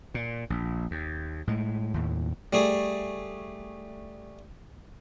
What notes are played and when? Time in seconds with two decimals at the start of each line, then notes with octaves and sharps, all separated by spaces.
0.14 A#2
0.50 A#1
0.91 D#2
1.47 A2 G#3
1.94 D#2 A2
2.53 G3 A3 G#4